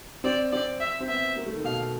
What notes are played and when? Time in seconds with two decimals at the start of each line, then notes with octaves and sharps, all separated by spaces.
0.24 C4 D5
0.52 C4 D5
0.80 E5
1.00 C4
1.09 B3 E5
1.36 A#3
1.46 A3
1.56 D#3
1.64 B2 F5